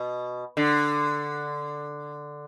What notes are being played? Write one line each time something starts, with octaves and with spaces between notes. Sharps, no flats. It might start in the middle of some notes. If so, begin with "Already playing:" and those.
Already playing: B2
D3